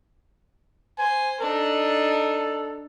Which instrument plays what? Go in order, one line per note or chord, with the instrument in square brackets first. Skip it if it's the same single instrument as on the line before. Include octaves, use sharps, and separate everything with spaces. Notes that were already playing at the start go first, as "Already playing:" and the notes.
[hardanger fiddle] C5 [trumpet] G#5
[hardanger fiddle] D4 D#4 [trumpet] A4